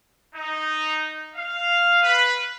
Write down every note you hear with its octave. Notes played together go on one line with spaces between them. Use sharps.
D#4
F5
B4